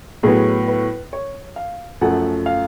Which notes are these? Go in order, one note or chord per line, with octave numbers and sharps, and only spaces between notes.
A2 F#3 B3 G#4
B4
C#5
F5
F#2 F3 A3 F#5
F5